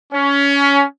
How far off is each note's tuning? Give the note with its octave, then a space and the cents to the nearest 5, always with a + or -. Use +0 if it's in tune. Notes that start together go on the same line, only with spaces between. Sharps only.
C#4 +20